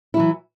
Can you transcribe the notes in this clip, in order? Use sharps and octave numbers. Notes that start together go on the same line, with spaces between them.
E3 F#3 E4